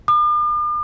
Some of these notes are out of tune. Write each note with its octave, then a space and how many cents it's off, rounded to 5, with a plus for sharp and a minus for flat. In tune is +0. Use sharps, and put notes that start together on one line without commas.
D6 +45